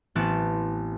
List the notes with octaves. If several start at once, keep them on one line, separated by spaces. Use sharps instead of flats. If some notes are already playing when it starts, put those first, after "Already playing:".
A1 E3 B3 C4 A5